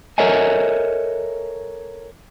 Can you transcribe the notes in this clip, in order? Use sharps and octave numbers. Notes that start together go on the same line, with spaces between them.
A4 A#4 C#5 D#5 E5 G#5